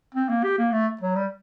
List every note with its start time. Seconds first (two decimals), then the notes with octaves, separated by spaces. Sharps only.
0.14 C4
0.29 A#3
0.44 G4
0.58 A#3
0.72 A3
1.01 F#3
1.16 G3